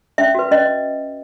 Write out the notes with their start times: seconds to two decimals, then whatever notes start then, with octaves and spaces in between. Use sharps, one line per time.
0.18 C#4 E5
0.35 F#4 B4
0.51 C#4 D#5